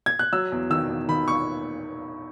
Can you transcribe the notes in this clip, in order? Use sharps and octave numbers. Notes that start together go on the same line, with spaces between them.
G#6
F#6
F#3 E6
E2
D#3 E6
E2
D#3 B5
C#6